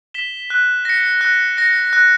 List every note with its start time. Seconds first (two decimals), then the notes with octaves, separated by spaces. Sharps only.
0.14 B6 E7 G7
0.50 F#6
0.85 A#6 C#7
1.21 F#6
1.58 A#6 C#7
1.93 F#6